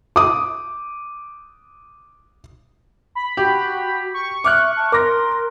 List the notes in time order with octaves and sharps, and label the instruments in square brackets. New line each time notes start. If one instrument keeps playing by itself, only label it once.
[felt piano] D6 D#6
[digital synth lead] B5
[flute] F#4 [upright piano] G4
[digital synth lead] C#6
[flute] E5 [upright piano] D6 F6 F#6
[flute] A5
[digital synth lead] A#4 [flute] C6 [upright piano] D6 A#6